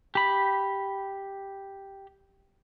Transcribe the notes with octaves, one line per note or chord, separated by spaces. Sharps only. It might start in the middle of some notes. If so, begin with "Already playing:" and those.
G4 B5